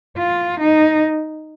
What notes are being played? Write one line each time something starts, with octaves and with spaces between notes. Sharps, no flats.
F4
D#4